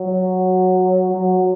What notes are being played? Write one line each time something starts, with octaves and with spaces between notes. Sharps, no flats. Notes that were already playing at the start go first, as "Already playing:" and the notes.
Already playing: F#3
F#3